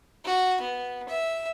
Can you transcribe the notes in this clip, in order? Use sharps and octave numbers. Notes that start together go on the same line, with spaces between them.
F#4
B3
E5